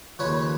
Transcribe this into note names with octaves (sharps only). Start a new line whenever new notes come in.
D#2 C#3 F3 B4 C#5